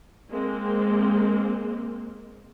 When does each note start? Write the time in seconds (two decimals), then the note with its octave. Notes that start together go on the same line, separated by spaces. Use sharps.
0.30 G#3 A#3 C4